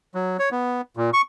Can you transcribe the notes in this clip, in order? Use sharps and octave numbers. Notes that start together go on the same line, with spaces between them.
F#3
C#5
B3
A#2
C#6